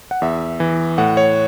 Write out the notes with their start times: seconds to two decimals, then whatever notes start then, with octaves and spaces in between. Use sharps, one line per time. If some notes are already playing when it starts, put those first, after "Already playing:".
0.11 F#5
0.22 E2 E5
0.60 E3
0.98 A2 F#5
1.17 C#5